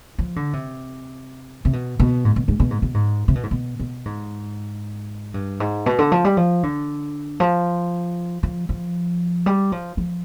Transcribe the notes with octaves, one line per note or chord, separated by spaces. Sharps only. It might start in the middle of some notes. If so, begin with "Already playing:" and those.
F3
D3
C3
C3
B2
B2
G#2
B2
G#2
B2
G#2
B2
G#2
C3
B2
G#2
B2
B2
G#2
G2
G#2
B2
D3
F3
G3
F3
D3
F3
F3
F3
G3
F3
F3